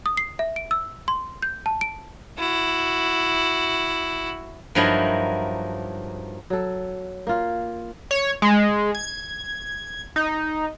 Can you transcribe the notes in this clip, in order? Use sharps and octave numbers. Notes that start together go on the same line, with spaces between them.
D#6
C7
E5
D7
E6
C6
G6
A5
D7
E4 F#4
G2 F3 F#3 D#4 E4 A#4
F#3 A4
A#3 F4
C#5
G#3
G#6
D#4